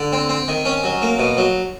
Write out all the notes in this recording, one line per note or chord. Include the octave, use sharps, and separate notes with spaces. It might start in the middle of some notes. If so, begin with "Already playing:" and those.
Already playing: D3
C4
C4
D#3
C#4
F#3
A#3
B2
F#3